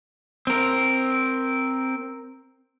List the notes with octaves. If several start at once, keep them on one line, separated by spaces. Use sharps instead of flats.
C4 A#4